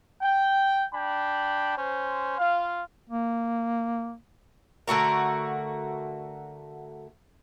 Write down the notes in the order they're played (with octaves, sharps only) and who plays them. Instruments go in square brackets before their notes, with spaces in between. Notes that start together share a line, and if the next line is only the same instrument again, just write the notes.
[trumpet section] G5
D4 G5 B5
C#4 C5
F4 F5
[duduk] A#3
[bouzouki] D3 A3 F#4 A#4